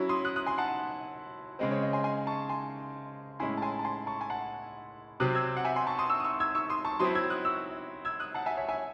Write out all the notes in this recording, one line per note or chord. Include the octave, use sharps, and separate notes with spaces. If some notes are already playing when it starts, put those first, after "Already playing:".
Already playing: F#3 C#4 E4
C6 D#6
D#6 F#6
D#6 F#6
G#5 C6
F#5 A5
C#3 G#3 C4 D#5
C#5
D#5
G#5 C6
G#5 C6
A5 C#6
G#5 C6
A2 G#3 C#4 E4 G#5 C6
A5
G#5 C6
A5
G#5 C6
A5 C#6
G#5
F#5 A5
C3 F#3 C4 D#6 F#6
E6 G#6
F#5
E5 G#5
G#5 C6
A5 C#6
C6 D#6
C#6 E6
D#6
C#6 E6
E6 G#6
C#6 E6
C6 D#6
A5 C#6
F#3 C4 E4 C6 D#6
E6 G#6
D#6 F#6
C#6 E6
E6 G#6
D#6 F#6
F#5 A5
E5 G#5
C#5 E5
E5 G#5